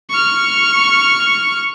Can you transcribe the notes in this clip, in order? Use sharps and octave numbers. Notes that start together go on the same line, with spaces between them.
C#6 F6